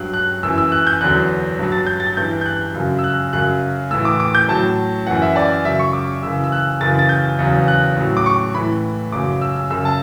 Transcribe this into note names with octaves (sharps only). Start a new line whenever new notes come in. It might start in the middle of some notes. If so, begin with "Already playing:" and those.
Already playing: G2 F#3 F#6
F#6
F#2 E3 E6
E6
F#6
G6
E2 D3 F#3 F#6
G2 F#3
A6
G6
A6
G2 E3 G6
G6
F#6
F#2 C#3 F#3
E6
F#6
F#2 C#3 F#3 F#6
A2 E3 E6
D6
D6
G6
A2 F#3 A5
F#2 E3 F#5
E5
D5
F#2 C#3 F#3 E5
C#6
D6
F#2 C#3 E3 E6
E6
F#6
F#2 C#3 E3 A6
A6
G6
E2 C#3 F#3
F#6
A2 F#3
D6
C#6
A2 E3 B5
F#2 C#3 F#3 D6
E6
E6
F#2 C#3 F#3 E6
A5